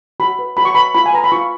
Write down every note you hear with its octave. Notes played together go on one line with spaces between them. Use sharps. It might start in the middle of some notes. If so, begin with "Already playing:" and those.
F#4 B5
B4
F#4 B5
C#6
B4 B5
F4 B5
G#5
B4 A#5
B5
F4 C#6